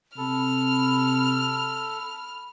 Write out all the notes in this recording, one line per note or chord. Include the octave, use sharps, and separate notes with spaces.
C3 A4 B5 F6